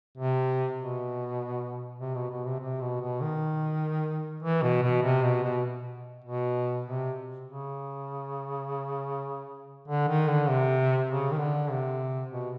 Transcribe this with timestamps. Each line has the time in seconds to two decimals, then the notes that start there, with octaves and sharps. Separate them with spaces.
0.18 C3
0.79 B2
2.00 C3
2.15 B2
2.30 B2
2.45 C3
2.60 C3
2.81 B2
3.01 B2
3.21 D#3
4.43 E3
4.63 B2
4.83 B2
5.03 C3
5.24 B2
5.44 B2
6.24 B2
6.86 C3
7.46 C#3
9.88 D3
10.09 D#3
10.28 D3
10.49 C3
11.10 C#3
11.31 D#3
11.40 D3
11.70 C3
12.31 B2